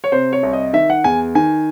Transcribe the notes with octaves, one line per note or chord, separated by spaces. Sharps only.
C#5
C3 C5
C#5
C2
D#5
D#3 E5
F#5
E2 G#5
D#3 G#5